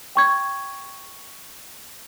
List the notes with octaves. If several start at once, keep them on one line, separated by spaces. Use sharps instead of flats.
G5 C#6 G#6